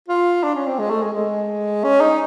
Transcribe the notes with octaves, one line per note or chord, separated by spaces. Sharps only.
F4
D4
C#4
C4
G#3
A3
G#3
G#3
C#4
D#4